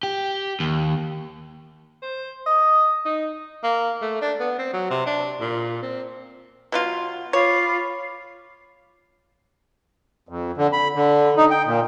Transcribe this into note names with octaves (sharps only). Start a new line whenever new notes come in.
G4
D#2
C5
D#5
D#4
A#3
A3
D4
B3
C4
F#3
C3
D4
A#2
C4
B2 F#3 F4
F4 C#5 B5 D6
F2
D3
B5
D3
D#4
G5
A#2